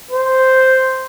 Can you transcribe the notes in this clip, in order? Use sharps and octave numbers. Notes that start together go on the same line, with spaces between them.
C5